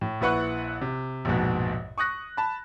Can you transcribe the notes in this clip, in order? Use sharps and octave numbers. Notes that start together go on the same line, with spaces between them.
A2
A#1 E4 B4 F#5 C#6 F#6
C3
A#1 F2 G#2 B2
C#6 D#6 F#6 A#6
A5 B5